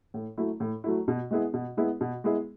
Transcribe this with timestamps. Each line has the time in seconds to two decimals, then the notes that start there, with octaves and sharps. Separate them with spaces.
0.14 A2
0.38 F#3 A3 E4
0.60 A2
0.84 F#3 A3 E4
1.08 B2
1.31 G#3 B3 E4 G#4
1.54 B2
1.77 G#3 B3 E4 G#4
2.01 B2
2.24 G#3 B3 E4 G#4